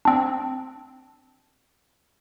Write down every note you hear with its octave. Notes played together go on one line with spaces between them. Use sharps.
C4 D4